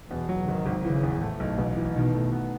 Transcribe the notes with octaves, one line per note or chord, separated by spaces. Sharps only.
E2 B2
F#3
G#1 D#3
G#1
C#3 E3
E2
A2 A3
B1
A1 B2
E3
B2 D#3
A3
B3